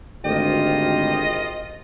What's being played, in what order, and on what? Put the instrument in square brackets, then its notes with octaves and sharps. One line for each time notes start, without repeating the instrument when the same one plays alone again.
[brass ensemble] G#1 F4 [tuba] D2 [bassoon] G4 [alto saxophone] D#5